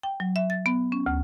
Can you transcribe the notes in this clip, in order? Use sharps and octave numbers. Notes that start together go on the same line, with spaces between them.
G5
F#3
E5
A6
B3
C#4
D2